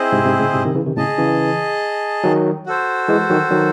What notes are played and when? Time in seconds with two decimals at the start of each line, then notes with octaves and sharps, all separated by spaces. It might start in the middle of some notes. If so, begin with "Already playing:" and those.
Already playing: C4 E4 G#4 C5 D#5
0.12 G#2 C3
0.25 G#2 C3
0.40 A2 C#3
0.54 G#2 C3
0.65 C3 D#3
0.75 C#3 E3
0.86 C3 D#3
0.96 A2 C#3 G#4 D#5 A5
1.18 C#3 E3
2.24 D#3 F#3
2.66 F#4 A4 C5
3.09 E3 G#3
3.30 D#3 F#3
3.51 D#3 F#3